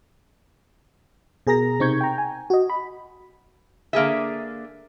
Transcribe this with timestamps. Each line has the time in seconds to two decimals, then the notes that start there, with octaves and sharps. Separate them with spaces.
1.47 B2 G#4 A#4 A#5 A#6
1.80 C3 C4 D#4 C#6 G6 G#6
2.01 G5 A#5
2.18 G#5
2.50 F#4 D#5
2.70 B5
3.93 D3 A#3 G#4 E5